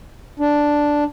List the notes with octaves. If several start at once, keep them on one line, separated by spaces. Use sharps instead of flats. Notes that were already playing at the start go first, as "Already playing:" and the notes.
D4